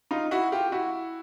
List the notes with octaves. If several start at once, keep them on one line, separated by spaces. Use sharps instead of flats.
D#4 F4
E4 F#4
F4 G4
E4 F#4